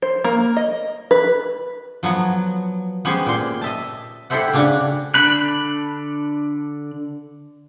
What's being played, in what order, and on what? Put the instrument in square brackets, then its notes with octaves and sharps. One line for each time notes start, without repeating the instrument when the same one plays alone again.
[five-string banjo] C5
A#3
D#5
B4
[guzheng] F3 F#3 B3
B3 C#4 G4 G#4 C5
A#2 C6
D#5 E5 A5
E4 G4 A4 C5 E5 F#5
C#3 C#4 D4 F#4
[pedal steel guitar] D3 D4 B5 F#6